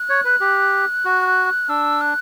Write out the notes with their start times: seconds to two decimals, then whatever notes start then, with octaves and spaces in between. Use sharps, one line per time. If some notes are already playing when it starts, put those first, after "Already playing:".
Already playing: F#6
0.09 C#5
0.25 B4
0.40 G4
1.05 F#4
1.69 D4 E6
2.01 F#6